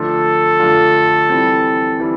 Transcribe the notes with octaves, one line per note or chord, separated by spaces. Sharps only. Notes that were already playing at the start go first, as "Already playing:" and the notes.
Already playing: D3 F3 A3 D4 F4 A4
D3 F3 A3 D4 F4
E3 G3 C4
E3 G3